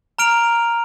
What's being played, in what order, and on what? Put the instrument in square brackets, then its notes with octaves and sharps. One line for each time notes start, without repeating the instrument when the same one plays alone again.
[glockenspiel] A#5 F6 D7 F7